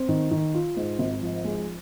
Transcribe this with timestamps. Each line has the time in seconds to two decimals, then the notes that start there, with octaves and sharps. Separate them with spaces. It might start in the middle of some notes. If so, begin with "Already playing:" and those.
Already playing: C4
0.09 D#3
0.31 D#3
0.54 F4
0.77 G#2
0.99 G#1
1.22 F3
1.44 G#3